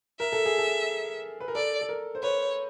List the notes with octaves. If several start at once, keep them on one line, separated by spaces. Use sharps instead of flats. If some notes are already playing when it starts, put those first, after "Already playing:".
A#4 E5
A4
G#4
A4
B4
A#4
A4 D5
A4
A#4
C5
B4 C#5